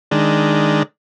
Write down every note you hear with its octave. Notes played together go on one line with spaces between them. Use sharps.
D#3 G#3 D4